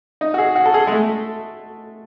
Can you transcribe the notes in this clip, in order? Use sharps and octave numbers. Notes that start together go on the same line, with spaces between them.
D#4
F#4
G#4
F#4
A4
G#4
G#3
A3